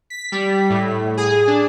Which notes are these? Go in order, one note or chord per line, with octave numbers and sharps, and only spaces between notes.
B6
G3
A2
G#4
D4